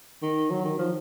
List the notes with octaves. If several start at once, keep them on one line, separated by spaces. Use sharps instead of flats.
D#3
F#3
D#3
F3